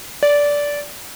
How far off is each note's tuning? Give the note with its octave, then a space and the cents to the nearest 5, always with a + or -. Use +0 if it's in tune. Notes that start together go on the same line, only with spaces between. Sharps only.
D5 -15